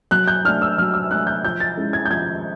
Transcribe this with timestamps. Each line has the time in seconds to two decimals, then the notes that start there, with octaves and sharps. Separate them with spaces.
0.11 F#3 F#6
0.28 G6
0.45 D4 F6
0.48 A3
0.62 E6
0.78 F#3 F6
0.94 E6
1.11 A3 D4 F#6
1.27 G6
1.43 F3 G6
1.60 A6
1.77 G#3 C#4 E4
1.93 G#6
2.06 G6
2.10 F3 G#6